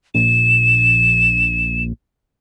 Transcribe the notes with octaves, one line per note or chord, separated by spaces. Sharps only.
A#1 E7